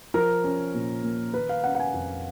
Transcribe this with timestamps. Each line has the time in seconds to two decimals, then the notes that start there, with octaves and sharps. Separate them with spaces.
0.14 F3 A#4
0.44 C#4
0.75 A#2
1.03 A#3
1.34 D#3 B4
1.49 F5
1.64 C#4 F#5
1.75 F#5
1.80 G#5
1.94 F2